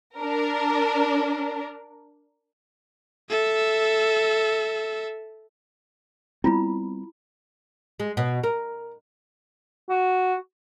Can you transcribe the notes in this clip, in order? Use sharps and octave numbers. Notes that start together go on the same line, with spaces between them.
D4 A#4
A4 E5
G3 B3 C4 E4 F4 B5
G#3
B2
A#4
F#4